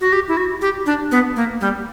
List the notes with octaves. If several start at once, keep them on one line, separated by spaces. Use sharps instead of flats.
F#4
G4
E4
F#4
G4
D4
B3
A#3
G3